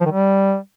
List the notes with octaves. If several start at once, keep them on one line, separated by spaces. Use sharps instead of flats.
F3
D#3
G3